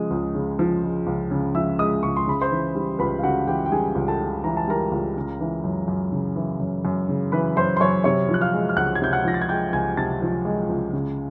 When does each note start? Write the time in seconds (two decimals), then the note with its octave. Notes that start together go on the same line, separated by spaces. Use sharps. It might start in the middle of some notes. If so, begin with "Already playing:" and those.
Already playing: C#3 F3 G#3 D#6
0.11 C#2
0.35 C#3
0.59 F3
0.83 G#3
1.07 C#2
1.31 C#3
1.55 F3 E5 E6
1.79 G#3 D#5 D#6
2.03 C#2 C#6
2.17 C6
2.27 C#3 B5
2.41 C5 C6
2.51 E3
2.75 G3
2.99 C#2 B4 B5
3.19 F5
3.23 C#3 F#4 F#5
3.47 E3 G4 G5
3.66 G5
3.72 G3 G#4 G#5
3.95 C#2
4.08 A4 A5
4.20 C#3
4.44 E3 A#5
4.57 A5
4.68 G3 A#4 A#5
4.92 C#2
5.16 C#3
5.40 E3
5.64 F#2
5.88 F#2
6.12 C#3
6.36 E3
6.60 F#2
6.85 F#2
7.09 C#3
7.32 E3 B4 B5
7.56 F#2 C5 C6
7.77 C6
7.80 F#2 C#5 C#6
8.04 C3 C#5 C#6
8.29 F3
8.34 F#6
8.41 F5 F6
8.53 G#3
8.69 F6
8.77 C#2 F#5 F#6
8.95 G#6
9.02 C3 G6
9.13 F#5 F#6
9.25 F3 A#6
9.34 A6
9.42 G#6
9.49 G#3 G5 G6
9.73 C#2 G#5 G#6
9.97 C3 A5 A6
10.22 F3
10.45 G#3
10.69 C#2
10.93 C#3